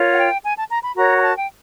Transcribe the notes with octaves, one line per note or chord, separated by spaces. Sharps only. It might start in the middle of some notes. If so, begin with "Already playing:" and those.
Already playing: F4 A#4 C#5
F#5
G5
G#5
A5
A#5
B5
F#4 A#4 C#5 A#5
A#5
A5
G5